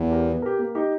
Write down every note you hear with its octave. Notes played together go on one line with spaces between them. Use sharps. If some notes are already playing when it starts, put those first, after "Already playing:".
Already playing: E2
G4 A#4
B3
G4 A#4
A#3
D#4 G4